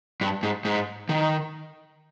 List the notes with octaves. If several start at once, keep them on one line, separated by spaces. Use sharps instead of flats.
G2
G#2
G#2
D#3